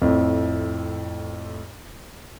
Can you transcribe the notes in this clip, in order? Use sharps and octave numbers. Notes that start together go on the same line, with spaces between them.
F2 A2